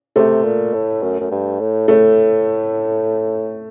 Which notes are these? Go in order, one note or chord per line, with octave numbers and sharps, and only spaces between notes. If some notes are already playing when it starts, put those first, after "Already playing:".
C3 A3
A#2
A2
F#2
F#2
G2
A2
A2 A3